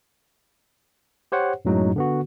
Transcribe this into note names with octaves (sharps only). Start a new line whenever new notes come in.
G4 C5 C#5 F#5
F#2 A2 F#3 G#3 D#4
D3 B3 F#4